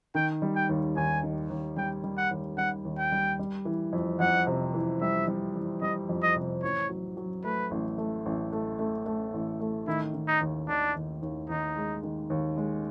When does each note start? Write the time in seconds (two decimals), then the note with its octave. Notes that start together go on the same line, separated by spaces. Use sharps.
0.15 D#3 G5
0.42 G3
0.55 G5
0.69 D#2
0.96 D#2 G#5
1.23 D#3
1.50 D#2
1.77 G3 G5
2.04 G3
2.17 F#5
2.31 D#2
2.57 G3 F#5
2.85 D#2
2.98 G5
3.12 G3
3.39 G3
3.65 E3
3.93 F2
4.20 F2 F#5
4.47 C3
4.74 E3
5.01 G3 E5
5.28 G3
5.55 E3
5.82 G3 D#5
6.09 F2
6.22 D#5
6.36 C3
6.63 A1 C#5
6.89 F#3
7.17 F#3
7.44 A3 B4
7.71 A1
7.98 A3
8.26 A1
8.52 A3
8.79 A3
9.06 A3
9.33 A1
9.60 A3
9.87 D#3 E4
10.14 D#3
10.27 D#4
10.41 D#2
10.68 D#3 D4
10.95 D#2
11.22 D#2
11.49 D#2 D#4
11.76 G#3
12.03 D#3
12.30 D#2
12.57 G#3